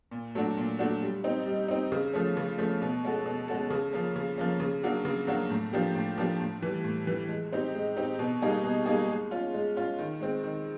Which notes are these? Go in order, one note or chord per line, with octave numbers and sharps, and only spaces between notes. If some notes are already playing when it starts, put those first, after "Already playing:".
A#2
F#3 A3 D4 F#4
A#2
F#3 A3 D4 F#4
G3
C4 D#4
G3
C4 D#4
C#3
F3 A3 C#4
C#3
F3 A3 C#4
B2
G#3 C#4 F#4 A4
B2
G#3 C#4 F#4 A4
C#3
F3 A#3 C#4
C#3
F3 A#3 C#4
C#3
F#3 A#3 D4 F#4
C#3
F#3 A#3 D4 F#4
A2
F3 A#3 D4 G4
A2
F3 A#3 D4 G4
A2
E3 G3
A2
E3 G3
G#3
C4 D#4 G4
G#3
C4 D#4 G4
B2
G3 A#3 D#4 G#4
B2
G3 A#3 D#4 G#4
G#3
C#4 F4
G#3
C#4 F4
D#3
G#3 C4
D#3